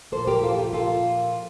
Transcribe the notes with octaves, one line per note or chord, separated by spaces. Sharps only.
A#2 F3 A#3 A4 C5
G4 A#4
F4 A4
G4
F4 A4